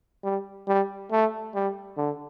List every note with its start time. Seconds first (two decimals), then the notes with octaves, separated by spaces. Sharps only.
0.24 G3
0.68 G3
1.12 A3
1.55 G3
1.97 D3